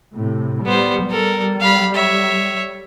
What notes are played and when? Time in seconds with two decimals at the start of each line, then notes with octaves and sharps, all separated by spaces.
0.14 A2 C3
0.66 G3 B3 C5
1.10 G3 A4 A#4
1.60 F5 B5
1.95 C#5 E5